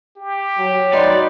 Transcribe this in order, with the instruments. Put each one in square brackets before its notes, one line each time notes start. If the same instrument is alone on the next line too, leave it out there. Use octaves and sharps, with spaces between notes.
[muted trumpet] G4
[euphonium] F#3
[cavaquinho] D#4 B4 C6 [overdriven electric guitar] D5